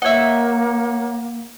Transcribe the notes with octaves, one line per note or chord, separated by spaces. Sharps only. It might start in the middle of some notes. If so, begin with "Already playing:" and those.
A#3 C#5 D#5 E5 F#5